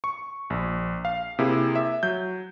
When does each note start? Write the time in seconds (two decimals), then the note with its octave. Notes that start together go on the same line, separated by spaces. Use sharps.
0.04 C#6
0.50 A#1
1.05 F5
1.39 C3 A#3 E4 G#4
1.75 E5
2.03 F#3 G6